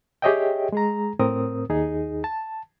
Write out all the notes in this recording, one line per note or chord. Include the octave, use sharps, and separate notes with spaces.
G4 G#4 C#5 D#5 E5 G5
G#3 G#4 A#5
A2 C4 A#4 D#6
D#2 D#4 G#4
A5